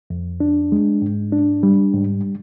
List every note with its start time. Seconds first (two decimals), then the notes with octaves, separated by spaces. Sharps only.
0.10 F2
0.40 D4
0.72 G#3
1.02 G#2
1.33 D4
1.63 G3
1.94 G#2